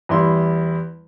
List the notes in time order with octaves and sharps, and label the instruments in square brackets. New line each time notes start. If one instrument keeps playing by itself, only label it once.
[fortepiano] E2 G3 E4 C6